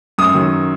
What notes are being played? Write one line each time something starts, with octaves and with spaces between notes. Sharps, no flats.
F#2 D#6
D#3 F#3